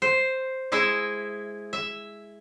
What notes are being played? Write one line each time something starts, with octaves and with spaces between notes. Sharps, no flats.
C5
G#3 E4 D#5 E5
E5